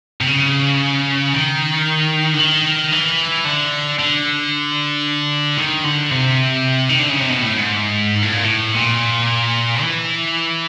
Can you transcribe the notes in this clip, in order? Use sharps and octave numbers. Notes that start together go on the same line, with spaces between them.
C3
C#3
D#3
D3
D#3
E3
D3
D3
D#3
D3
C3
D#3
D3
C#3
C3
B2
A2
G#2
A2
A#2
A2
A#2
E3